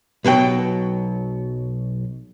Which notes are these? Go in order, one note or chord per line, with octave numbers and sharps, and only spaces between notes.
B1 B2 F#3 G5